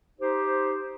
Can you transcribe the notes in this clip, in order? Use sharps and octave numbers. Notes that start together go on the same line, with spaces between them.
D#4 G4 C5